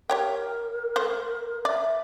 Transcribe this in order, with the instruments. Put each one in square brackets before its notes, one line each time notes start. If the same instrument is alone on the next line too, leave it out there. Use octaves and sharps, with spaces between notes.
[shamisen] G4 C#5 G5 [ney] A#4
[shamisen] A3 C5
[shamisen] D5 [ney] E5